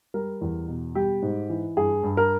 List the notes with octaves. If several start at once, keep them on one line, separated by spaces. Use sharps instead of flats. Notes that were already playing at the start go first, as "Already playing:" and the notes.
G3 A#4
E2
B2
G3 G4
G#2
E3
G2 G#4
G2
A#4